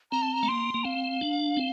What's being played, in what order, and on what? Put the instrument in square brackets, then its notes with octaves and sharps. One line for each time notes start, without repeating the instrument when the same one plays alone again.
[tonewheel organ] C4 [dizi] A#5
[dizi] A5
A#5
[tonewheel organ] A3
[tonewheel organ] A#3 [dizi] C6
[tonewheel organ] A#3
[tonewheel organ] C4 [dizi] F5
[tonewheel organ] D4
C4